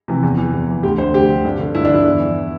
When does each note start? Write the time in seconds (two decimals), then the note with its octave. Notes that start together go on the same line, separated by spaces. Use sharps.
0.08 C3 E3
0.23 E2
0.38 E3
0.53 E2
0.69 E3
0.83 D2 G4
0.98 D3 C5
1.14 D2 G4
1.29 D3
1.45 G2
1.59 D3
1.75 G2 E4
1.85 D4
1.90 D3 E4
2.05 E2
2.20 E3